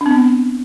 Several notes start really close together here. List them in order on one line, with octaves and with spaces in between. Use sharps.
D4 C4 B3